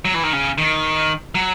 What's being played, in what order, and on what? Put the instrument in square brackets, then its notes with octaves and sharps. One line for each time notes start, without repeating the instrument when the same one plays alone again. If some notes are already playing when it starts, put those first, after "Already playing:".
[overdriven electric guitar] F#3
E3
D#3
C#3
D#3
F#3